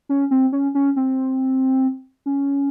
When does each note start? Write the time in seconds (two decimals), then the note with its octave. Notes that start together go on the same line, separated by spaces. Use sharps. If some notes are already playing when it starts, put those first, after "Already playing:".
0.09 C#4
0.31 C4
0.52 C#4
0.75 C#4
0.96 C4
2.26 C#4